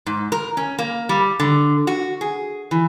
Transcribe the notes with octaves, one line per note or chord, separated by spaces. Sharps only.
G#2
A#4
C#4
A#3
G3
D3
F#4
G#4
E3